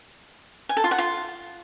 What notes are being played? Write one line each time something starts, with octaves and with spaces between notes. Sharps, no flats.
G#5
A4
F4
F#5
F4